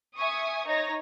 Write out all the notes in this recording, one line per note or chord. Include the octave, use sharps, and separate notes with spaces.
E5 G#5 C#6 D#6
D#4 C#5 A#6